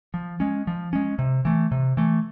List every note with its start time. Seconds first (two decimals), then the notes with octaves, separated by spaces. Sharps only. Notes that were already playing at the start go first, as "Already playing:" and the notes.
0.14 F3
0.40 G#3 C#4
0.67 F3
0.93 G#3 C#4
1.19 C3
1.45 E3 A3
1.72 C3
1.97 E3 A3